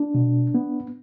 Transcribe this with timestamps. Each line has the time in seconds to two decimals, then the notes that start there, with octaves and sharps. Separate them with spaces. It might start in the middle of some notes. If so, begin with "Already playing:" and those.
Already playing: D4
0.14 B2
0.55 B3